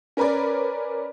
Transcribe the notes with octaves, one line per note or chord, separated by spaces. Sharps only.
C#4 A#4 B4 C#5 D5